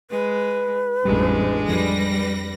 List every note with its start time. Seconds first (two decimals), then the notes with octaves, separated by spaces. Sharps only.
0.11 G#3 B4
1.05 A1 F2 G3 G#3 D4
1.69 F2 G3 B4 A#6